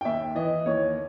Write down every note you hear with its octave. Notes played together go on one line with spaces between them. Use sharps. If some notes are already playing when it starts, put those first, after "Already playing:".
G5
D#2 E5
E3 D#5
D#2 C#5